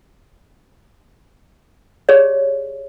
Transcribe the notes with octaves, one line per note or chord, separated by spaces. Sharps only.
G4 G#4 C#5 D5